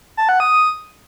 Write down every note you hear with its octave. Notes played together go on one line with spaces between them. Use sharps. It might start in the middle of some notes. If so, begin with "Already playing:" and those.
A5
F#5
D#6